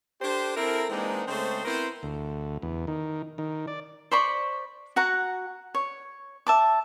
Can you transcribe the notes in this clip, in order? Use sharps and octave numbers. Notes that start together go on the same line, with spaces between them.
D4 G4 A4 C5
C4 E4 A4 A#4
E3 G#3 A#3 C4 D4 D#4
C#3 G#3 A3 C4 C5
B3 C4 E4 A#4 C5
D2
E2
D#3
D#3
D5
C5 D5 B5 C#6
F#4 F#5 A#5
C#5
E5 A5 D6